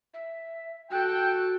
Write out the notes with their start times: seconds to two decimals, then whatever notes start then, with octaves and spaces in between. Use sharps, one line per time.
0.14 E5
0.91 F#4 A4 G5 F#6